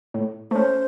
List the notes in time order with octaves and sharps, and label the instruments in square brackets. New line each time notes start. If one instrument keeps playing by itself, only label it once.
[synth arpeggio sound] A2
[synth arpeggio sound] A3 C#4 [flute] C5